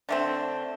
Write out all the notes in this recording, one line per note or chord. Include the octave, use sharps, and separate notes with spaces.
D3 A3 C4